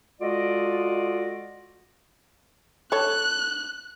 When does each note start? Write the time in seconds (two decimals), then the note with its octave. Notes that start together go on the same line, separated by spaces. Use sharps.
0.20 G#3 F4 F#4 A4 D5 D#5
2.92 A4 C#5 F#6